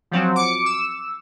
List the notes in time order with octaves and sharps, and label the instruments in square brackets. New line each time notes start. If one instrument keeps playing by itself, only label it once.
[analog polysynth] F3 F#3 C4
D6 C#7
E6